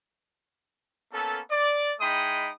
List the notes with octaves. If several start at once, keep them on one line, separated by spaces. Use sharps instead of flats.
A#3 B3 C#4 A4
D5
G#3 D#4 E4 G5 B5 D#6